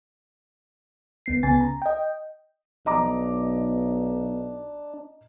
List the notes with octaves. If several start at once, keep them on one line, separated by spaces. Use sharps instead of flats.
D2 B3 C7
C#2 C#3 B3 G#5 A6
A#5
D#5 G5
B1 D4 D#5 A#5 D6